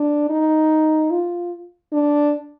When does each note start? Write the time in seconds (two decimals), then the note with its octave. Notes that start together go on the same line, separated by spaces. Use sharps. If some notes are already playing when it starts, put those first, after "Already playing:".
Already playing: D4
0.30 D#4
1.11 F4
1.92 D4